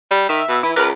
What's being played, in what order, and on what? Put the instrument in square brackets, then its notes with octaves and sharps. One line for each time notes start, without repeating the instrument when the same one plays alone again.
[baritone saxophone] G3
[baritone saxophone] D#3 [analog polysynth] E5
[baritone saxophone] B2
[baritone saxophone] E3 [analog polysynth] E4
[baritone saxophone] C#2 [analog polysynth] A#4 B4 D6